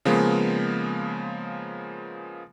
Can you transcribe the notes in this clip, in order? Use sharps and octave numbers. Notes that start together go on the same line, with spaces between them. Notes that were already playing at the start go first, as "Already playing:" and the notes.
C#3 F3 G#3 A#3 B3